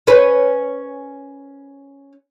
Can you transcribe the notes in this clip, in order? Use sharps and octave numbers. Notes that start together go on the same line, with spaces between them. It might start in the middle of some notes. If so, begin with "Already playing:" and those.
C#4 B4